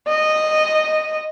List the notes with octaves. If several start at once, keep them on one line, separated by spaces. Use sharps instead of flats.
D#5